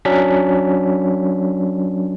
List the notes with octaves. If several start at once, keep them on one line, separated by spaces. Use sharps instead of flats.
F#3 C#4 D4 B6